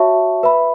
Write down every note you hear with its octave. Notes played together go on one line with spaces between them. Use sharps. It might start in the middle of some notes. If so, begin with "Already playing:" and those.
Already playing: F#4 C#5 E5 A5 C#6
B4 E5 B5